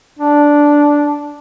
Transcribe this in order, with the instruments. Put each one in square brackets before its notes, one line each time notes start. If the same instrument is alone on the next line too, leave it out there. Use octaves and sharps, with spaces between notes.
[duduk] D4